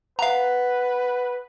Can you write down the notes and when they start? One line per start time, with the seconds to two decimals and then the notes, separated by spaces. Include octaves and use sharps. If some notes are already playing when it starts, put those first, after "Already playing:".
0.19 B4 F5 F#5 A#5